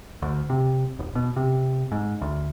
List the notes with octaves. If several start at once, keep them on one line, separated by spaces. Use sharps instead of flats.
D2
C3
D#1
B2
C3
G#2
D2